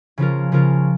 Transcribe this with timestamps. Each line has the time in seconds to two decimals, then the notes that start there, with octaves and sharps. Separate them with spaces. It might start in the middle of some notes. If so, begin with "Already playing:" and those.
0.18 C#3 F3 C#4 F4 A#4
0.52 C#3 F3 C#4 F4 A#4